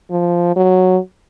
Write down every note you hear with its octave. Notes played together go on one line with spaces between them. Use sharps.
F3
F#3